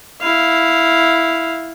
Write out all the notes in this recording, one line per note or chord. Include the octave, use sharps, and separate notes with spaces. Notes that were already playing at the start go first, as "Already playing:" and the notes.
E4 F5